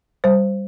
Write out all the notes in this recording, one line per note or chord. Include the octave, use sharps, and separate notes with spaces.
G3 C5